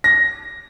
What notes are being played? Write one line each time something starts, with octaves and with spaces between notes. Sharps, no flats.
A#6